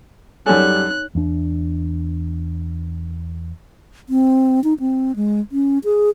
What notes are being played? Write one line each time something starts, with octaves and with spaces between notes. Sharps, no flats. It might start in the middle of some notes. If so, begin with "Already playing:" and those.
F#2 G3 D#4 A4 C#5 G#5 F#6
E2 D4
C4
D#4
C4
G#3
C#4
G#4